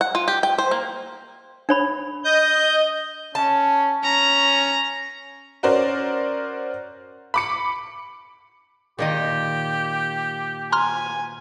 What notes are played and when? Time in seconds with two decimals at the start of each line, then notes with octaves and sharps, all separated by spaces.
0.01 F#5
0.15 F4
0.28 G4
0.43 G5
0.58 C5
0.71 A#3
1.69 D4 C#5 B5
2.24 D#5 G6
3.35 C#4 A5
4.03 C#4 A#5
5.63 C#4 F#4 A#4 C5 D5
7.34 B5 D6 C#7
8.99 A#2 D#3 G4 D#5
10.72 G#5 A#5 C6 F6